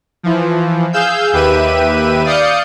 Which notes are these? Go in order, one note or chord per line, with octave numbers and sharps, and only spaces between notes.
E3 F3
G#4 F5 E6 G6
D#2 G4 B4 E5 D#7
D5 F5 D#6 G6 C#7